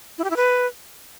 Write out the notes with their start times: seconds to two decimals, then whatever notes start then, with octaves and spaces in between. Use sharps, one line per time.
0.18 E4
0.24 G4
0.30 E4
0.36 B4